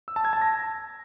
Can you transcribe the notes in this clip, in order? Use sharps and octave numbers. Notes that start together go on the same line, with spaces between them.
E6
A5
G#6
A5
A#6